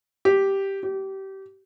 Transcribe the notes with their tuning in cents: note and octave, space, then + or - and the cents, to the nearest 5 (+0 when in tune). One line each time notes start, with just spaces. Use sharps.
G4 -5
G4 -25